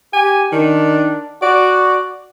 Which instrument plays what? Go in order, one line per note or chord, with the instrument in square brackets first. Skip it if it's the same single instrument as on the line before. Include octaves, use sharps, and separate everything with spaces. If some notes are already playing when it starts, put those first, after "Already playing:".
[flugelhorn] G4 [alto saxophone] G#5
[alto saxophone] D#3 [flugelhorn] D4
[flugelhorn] F#4 [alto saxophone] D5